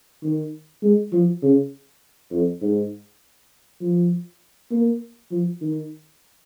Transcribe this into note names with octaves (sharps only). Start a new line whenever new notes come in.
D#3
G#3
F3
C#3
F2
G#2
F3
A#3
F3
D#3